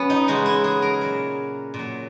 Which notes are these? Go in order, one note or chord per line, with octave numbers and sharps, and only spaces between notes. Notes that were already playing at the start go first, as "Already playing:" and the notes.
Already playing: F#3 B3 C#4
D#4
C#3 E3 G#3 F#4
E4
G#4
A#4
A#2 F#3
A#2
F#3